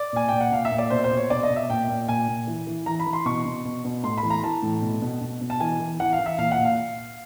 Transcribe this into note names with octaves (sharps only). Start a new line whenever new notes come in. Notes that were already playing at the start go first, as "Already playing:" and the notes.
Already playing: D5
A#2 G#5
A#2 G5
F#5
A#2 F5
E5
A#2
D5
B2 C5
C5
B2
C#5
B2 D5
D#5
B2
E5
A#2 G5
A#2
A#2 G#5
A#2
E3
E3
E3 A#5
B5
E3
C6
B2 C#6
B2
B2
B2
A2 C6
B5
E3
A#5
E3 A5
A2
B2
B2
B2
B2
A5
E3 G#5
E3
E3 F#5
F5
E3
E5
A#2 F5
F#5
A#2
F5